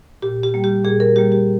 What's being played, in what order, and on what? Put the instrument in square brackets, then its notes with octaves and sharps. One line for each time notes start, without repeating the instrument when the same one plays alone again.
[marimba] A#2 G4
G4
G3 A#3
G4
A#2 G#4
A#4
G3 A#3 G4
G4